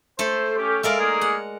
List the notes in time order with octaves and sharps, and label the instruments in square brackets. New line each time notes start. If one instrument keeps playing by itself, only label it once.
[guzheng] A3 A4 [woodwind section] C5
[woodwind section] C#4 G4
[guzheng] G#3 A#4 D5 [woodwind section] E5 F5
[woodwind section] A#3 D#4 G#4
[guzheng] F#5